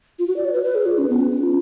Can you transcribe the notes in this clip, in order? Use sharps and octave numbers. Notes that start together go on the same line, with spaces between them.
F4
F#4
D5
C#5
B4
B4
G#4
F4
C#4
B3
C#4
C#4
F4